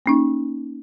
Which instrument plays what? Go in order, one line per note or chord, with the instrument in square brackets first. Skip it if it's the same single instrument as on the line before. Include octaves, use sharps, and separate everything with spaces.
[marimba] A#3 C#4 D#4